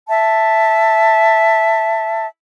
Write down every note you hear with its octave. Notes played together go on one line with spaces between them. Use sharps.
E5 A5